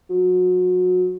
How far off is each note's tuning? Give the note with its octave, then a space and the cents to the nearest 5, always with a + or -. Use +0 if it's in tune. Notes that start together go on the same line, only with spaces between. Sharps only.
F#3 -30